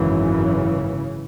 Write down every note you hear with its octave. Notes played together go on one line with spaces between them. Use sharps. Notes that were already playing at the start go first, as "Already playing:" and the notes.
Already playing: G#1 F#2 C#3 E3